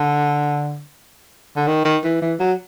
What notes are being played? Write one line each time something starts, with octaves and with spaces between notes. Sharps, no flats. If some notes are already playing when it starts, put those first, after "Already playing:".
Already playing: D3
D3
D#3
D#3
E3
E3
F#3